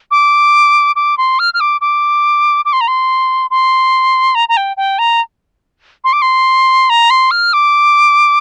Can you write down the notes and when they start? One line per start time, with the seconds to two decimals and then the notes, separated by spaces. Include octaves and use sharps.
0.11 D6
0.96 D6
1.18 C6
1.39 F6
1.54 F6
1.60 D6
1.81 D6
2.65 D6
2.73 C6
2.81 A#5
2.88 C6
3.50 C6
4.35 A#5
4.49 A#5
4.57 G5
4.77 G5
4.99 A#5
6.04 C6
6.13 D6
6.22 C6
6.90 A#5
7.10 C6
7.31 F6
7.53 D6